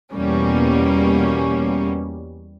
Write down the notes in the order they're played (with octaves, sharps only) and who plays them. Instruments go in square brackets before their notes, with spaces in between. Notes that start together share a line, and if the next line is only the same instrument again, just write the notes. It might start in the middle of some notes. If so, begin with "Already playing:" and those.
[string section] E2 B2 G3 A#3 C#4